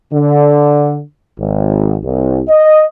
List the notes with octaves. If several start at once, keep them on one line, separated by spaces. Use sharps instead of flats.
D3
G#1
C2
D#5